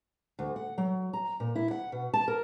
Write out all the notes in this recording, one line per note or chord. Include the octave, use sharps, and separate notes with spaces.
D2
F#5
F#3
A#5
A#2
E4
F#5
B2
A5
A#4